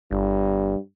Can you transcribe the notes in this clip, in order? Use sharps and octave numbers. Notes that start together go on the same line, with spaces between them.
G1 G2